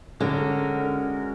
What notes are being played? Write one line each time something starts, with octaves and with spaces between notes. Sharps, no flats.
D3 G#3 C#4 F#4 A#4